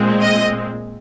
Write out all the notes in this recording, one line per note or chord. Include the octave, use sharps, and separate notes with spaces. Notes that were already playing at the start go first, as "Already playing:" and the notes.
Already playing: A#2 G#3 C4
D#5